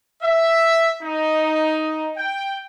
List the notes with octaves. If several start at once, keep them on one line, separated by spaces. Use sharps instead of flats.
E5
D#4
G5